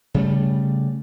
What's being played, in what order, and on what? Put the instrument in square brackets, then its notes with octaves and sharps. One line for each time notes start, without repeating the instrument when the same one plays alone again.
[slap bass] C#3 G3 A3